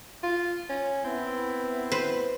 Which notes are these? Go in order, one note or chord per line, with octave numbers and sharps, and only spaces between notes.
F4
C#4
B3 C4 E4
B4 C5